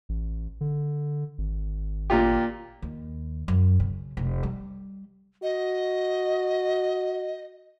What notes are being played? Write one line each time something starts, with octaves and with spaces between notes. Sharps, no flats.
A1
D3
G#1
A#2 F4 G4
D#2
F#2
C#3
F1
G3
F#4 D#5